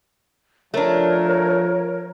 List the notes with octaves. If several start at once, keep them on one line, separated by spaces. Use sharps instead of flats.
F3 A3 D4 A#4 C#5